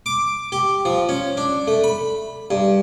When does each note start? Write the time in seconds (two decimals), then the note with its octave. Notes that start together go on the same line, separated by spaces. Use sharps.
0.06 D6
0.52 G4
0.85 F3
1.09 C#4
1.37 D4
1.67 A3
1.84 B5
2.51 G2